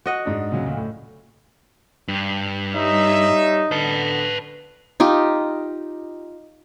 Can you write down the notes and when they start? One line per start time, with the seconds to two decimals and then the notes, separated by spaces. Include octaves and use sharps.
0.06 F#4 D#5 F#5
0.25 G#2 D4
0.52 A#2 C#3 F#3
0.63 D2 A#2
0.77 A2
2.08 G2
2.75 G3 D#4 C#5 E5
3.71 D3 B3 B4 A5
5.00 D#4 F4 G4